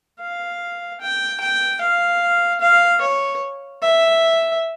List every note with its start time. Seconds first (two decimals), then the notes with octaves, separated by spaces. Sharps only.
0.20 F5
1.01 G5
1.41 G5
1.81 F5
2.61 F5
3.01 C#5
3.82 E5